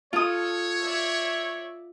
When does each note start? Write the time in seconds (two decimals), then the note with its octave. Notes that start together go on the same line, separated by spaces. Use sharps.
0.13 F4 A4 C#5 D#6
0.81 D5 E5